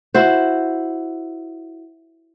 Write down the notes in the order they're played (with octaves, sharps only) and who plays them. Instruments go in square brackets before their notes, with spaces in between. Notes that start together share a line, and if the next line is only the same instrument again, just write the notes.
[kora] E4 F#4 C5